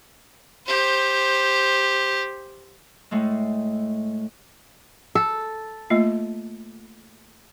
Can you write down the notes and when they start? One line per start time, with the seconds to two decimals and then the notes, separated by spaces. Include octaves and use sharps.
0.66 G4 C5
3.11 A2 G#3 A3
5.15 A4
5.90 A3 A#3 F4